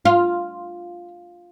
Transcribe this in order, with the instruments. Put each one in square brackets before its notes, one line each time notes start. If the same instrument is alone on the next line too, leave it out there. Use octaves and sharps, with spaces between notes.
[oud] F4